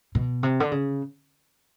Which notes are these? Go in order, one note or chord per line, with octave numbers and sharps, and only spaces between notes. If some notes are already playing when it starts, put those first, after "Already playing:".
B2
C3
D3
C#3